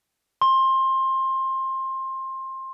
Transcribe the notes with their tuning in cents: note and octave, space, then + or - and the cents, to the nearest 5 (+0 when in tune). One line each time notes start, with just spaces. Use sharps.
C6 +20